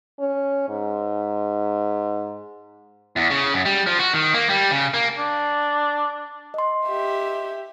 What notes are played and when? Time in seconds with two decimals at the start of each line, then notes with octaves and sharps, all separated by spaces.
0.19 C#4
0.69 G#2
3.16 E2
3.30 C#3
3.54 F#2
3.66 G3
3.87 F3
3.99 F#4
4.14 D#3
4.34 A#3
4.49 G3
4.71 C#3
4.94 A#3
5.18 D4
6.54 D#5 C6
6.85 G4 E5